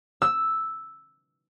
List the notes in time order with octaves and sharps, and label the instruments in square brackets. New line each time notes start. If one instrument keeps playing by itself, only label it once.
[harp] E6